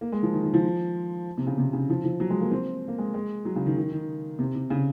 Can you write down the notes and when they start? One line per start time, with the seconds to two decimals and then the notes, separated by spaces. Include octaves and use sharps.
0.01 A#3
0.12 G#3
0.23 F3
0.33 D#3
0.43 D#3
0.54 F3
1.37 C3
1.47 C#3
1.58 C3
1.73 C#3
1.90 F3
2.04 F3
2.20 F#3
2.30 G#3
2.41 A#3
2.51 C4
2.88 A#3
2.98 G#3
3.14 G#3
3.45 F#3
3.56 C#3
3.66 D#3
3.77 D#3
3.92 D#3
4.39 C3
4.55 C3
4.70 C#3